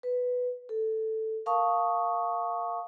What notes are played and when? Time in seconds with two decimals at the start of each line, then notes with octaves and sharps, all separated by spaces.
0.03 B4
0.69 A4
1.46 A#4 F5 A5 C#6 D#6